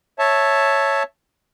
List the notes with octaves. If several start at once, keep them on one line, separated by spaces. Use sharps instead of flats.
C#5 E5 A5